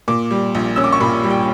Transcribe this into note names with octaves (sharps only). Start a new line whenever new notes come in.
A#2 D6
G3
A#1
C#4 E6
D6
C#6
A#2 B5
G3
G5